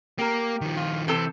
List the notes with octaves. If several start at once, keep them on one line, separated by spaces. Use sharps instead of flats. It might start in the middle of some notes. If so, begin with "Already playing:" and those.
A#3 G4 A#4
D#3 F3
F4
C3 E3 C4 A4